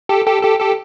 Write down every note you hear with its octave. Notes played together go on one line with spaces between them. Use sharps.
G4 A4
G4 A4
G4 A4
G4 A4